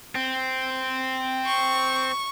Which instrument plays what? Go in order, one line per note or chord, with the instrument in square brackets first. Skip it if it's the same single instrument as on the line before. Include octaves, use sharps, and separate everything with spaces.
[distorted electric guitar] C4
[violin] C#6